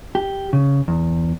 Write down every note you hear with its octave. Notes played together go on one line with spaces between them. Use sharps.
G4
C#3
E2